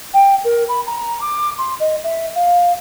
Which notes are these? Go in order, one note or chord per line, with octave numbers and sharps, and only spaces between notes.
G5
A#4
B5
A#5
D6
C6
D#5
E5
F5